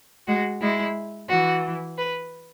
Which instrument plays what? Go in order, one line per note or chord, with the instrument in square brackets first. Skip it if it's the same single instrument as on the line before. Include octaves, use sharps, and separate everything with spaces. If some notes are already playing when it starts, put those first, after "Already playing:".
[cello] G#3 [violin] F#4
[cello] G#3 [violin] E4
[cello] E3 [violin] F#4
[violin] B4